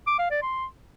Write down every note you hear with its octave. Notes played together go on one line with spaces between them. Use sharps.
D6
F5
D5
C6